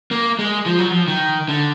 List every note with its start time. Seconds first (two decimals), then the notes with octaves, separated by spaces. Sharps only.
0.11 A#3
0.39 G#3
0.66 F3
0.79 F#3
0.91 F3
1.08 D#3
1.49 D3